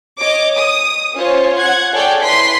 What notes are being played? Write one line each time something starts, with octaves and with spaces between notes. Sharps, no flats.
C#5 D#5 D6
D#6
C#4 F4 C5 C#5
F#5 G#6
G#4 A4 C#5 D5 G5
E4 B4 C6 B6